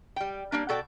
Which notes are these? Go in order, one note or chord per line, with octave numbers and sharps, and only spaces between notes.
G3 G5
G3 A#3 D4
B2 F#4 A4 D5 G5